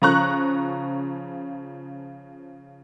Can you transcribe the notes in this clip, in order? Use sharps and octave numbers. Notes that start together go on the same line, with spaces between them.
C#3 F3 A#5 C#6 F#6